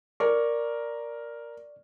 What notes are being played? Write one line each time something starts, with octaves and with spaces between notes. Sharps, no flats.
A#4 D5 C#6